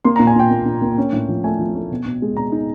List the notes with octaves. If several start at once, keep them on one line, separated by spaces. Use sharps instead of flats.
A#3 C6
A#2 A#5
G#5
A#2 G5
A#2
A#2
A#3
C#4
A2
F3
A3 G#5
F3
A3
B2
B2
G#3
B2 A#5
D#4